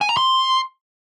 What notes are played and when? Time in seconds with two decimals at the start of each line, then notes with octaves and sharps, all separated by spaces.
0.01 G#5
0.09 A#5
0.17 C6